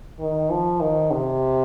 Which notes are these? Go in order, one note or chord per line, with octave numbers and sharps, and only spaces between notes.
D#3
F3
D#3
C3